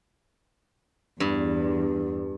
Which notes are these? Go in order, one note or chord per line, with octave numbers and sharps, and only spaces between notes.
E2 G2